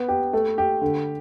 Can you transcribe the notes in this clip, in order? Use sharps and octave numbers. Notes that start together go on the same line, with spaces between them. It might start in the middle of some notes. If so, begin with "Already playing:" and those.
Already playing: B3
G4
A3
G4
D3